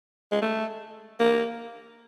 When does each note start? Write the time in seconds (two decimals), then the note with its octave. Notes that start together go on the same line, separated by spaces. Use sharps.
0.32 G#3
0.42 A3
1.20 A#3